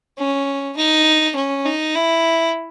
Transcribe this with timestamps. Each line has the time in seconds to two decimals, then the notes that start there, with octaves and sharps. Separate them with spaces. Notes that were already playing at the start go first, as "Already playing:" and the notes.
0.18 C#4
0.77 D#4
1.36 C#4
1.66 D#4
1.96 E4